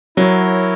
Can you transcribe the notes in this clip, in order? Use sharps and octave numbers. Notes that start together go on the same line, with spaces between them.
F#3 E4 A#4 C#5